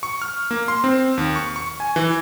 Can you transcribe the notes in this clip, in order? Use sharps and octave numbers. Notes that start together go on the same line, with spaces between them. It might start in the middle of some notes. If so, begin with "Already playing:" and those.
C#6
F6
A#3
C6
C4
D#2
C#6
C#6
G#5
E3